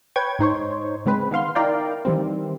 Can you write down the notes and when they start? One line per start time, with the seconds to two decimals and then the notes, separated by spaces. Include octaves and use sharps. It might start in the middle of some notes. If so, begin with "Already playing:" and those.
0.16 B4 C#5 G5 C#6 G#6
0.39 G#2 D#4 C5 C#5
1.06 C#3 G#3 C4 B4
1.31 D#3 B3 F5 C6
1.55 D#4 E4 A#4 D5 F5 G5
2.05 D#3 E3 G3 C4